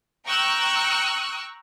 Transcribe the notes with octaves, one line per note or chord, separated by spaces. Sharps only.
G5 A#5 C#6 E6 F#6